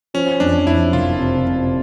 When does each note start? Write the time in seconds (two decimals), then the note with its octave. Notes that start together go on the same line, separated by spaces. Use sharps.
0.14 F3 C#4
0.40 F2 D4
0.67 F2 E4
0.93 F#1 F4
1.19 C3
1.45 C3